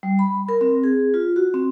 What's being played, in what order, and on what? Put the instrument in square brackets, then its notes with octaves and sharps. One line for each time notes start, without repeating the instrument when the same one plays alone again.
[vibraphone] G3
B5
A#4
C4
G#4
F4
F#4
C4